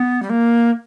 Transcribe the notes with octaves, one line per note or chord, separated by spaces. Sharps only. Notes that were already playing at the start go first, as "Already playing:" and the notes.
Already playing: B3
G3
A#3